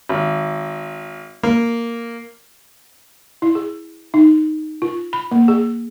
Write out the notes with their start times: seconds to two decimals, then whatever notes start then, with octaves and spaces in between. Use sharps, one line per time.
0.09 G#1
1.43 A#3
3.42 E4
3.55 G#4
4.14 D#4
4.82 F4
5.13 B5
5.32 A#3
5.48 G#4